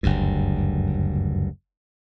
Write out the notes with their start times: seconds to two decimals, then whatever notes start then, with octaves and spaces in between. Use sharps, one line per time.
0.03 F#1 D2 G2